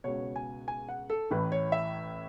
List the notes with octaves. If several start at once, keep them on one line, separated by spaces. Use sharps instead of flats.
C#2 B2 C#5
G#5
G#5
F#5
A4
A1 A2 E3 B4
C#5
E5